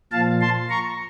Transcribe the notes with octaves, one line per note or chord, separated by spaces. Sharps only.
A#2 F3 F5 A5
A5 C6
A#5 C#6